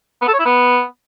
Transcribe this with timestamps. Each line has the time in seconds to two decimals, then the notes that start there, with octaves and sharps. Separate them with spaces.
0.22 B3
0.27 A4
0.33 C#5
0.39 E4
0.45 B3